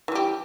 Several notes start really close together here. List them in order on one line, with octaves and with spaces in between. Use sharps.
E3 G3 G4